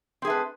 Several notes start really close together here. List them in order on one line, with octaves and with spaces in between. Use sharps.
C4 G#4 A3 B4